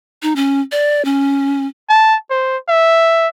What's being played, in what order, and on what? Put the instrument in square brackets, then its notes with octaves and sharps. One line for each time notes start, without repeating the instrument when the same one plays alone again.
[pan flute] D#4
C#4
D5
C#4
[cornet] A5
C5
E5